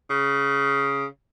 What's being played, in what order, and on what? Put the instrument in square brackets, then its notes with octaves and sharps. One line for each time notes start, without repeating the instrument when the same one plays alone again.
[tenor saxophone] C#3